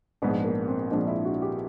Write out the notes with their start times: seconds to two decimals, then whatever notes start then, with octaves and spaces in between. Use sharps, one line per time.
0.22 A#1 G#2 F3 B3
0.44 A#3
0.68 C4
0.91 A#1 G#2 F3 D4
1.07 E4
1.25 F#4
1.42 G4